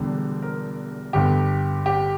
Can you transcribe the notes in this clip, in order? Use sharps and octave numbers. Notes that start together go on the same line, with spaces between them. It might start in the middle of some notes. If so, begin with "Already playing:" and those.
Already playing: E1 E2 D3 G3
A#4
G1 G2 D3 G4
G4